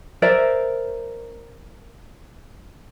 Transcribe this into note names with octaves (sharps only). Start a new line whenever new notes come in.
A#4 C5 D5 E5